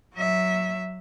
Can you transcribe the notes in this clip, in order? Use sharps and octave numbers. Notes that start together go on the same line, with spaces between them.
F#3 E5